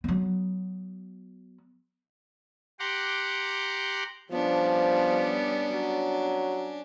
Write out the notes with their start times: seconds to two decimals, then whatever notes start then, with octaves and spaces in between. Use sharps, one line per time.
0.04 F#3 B3
2.79 G4 F#5 A#5 C6 D6
4.32 F3 G3 B3 C#4 D4
5.72 F#3